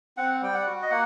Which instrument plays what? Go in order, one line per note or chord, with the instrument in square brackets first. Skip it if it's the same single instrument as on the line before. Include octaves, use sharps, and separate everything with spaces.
[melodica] C4 F#5
G3 G5
F#5
F#4
D#5
A#3 F#5